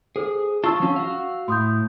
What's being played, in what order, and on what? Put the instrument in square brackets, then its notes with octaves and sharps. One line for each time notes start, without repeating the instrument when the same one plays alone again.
[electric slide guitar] G#4 [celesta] A4 C5
[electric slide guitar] F4 A5 [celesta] C#6 E6
[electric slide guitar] F3 F#3 C#4
F#4 F5
[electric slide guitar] A2 [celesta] C6 D#6 G6